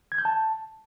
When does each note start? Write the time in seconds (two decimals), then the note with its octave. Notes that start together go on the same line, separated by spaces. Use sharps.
0.12 G#6
0.18 G6
0.25 A5